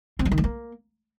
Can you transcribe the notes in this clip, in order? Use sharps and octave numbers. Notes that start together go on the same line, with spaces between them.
C4
G3
D#3
G#3
A#3